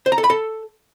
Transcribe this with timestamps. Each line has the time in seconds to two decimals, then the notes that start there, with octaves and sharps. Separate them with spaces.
0.06 C5
0.12 A#5
0.18 A4
0.24 B5
0.30 A4